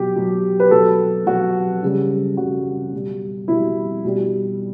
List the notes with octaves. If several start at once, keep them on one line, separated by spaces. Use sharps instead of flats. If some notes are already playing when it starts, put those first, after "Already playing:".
Already playing: B2 F#3 G4
B2 F#3
B4
B2 F#3 A4
B2 F#3 F#4
C#3 G3
C#3 G3 F#4
B2 G3
B2 G3 E4
B2 G3